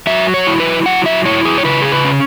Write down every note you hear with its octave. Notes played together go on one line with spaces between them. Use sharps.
F#3 E5
C#5
E4
B4
F#3 F#5
E5
E4 C#5
G#4
C#5
C#3 B4
G#4
B4
C#4